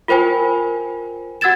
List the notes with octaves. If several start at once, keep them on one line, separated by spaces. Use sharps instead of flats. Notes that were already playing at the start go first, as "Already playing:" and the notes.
F4 A#4 C5 G5 G#5
F#4 F#5 E6 G#6 A6 E7